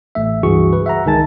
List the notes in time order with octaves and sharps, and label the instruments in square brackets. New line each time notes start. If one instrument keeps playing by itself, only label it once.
[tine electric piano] A1 A3 E5
C#2 G2 E3 F#4 G#4 C#6
B4
E5 F#5 A#5
C#2 D#3 G#3 G#5 A5 A6